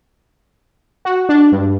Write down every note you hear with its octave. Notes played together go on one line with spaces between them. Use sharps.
F#4
D4
G2